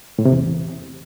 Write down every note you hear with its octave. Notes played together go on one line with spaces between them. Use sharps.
A2
C3
E2